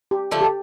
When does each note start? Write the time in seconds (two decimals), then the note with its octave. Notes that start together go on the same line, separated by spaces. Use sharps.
0.11 G4
0.31 D3 F3 A3 A4
0.41 G4